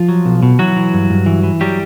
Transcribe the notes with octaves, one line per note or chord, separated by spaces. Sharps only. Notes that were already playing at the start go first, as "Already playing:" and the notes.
Already playing: F3 F4
F#3
B1
B2
E3 F#3 F#4
E3
G2
G2
E3
E3
F#3 G3 G4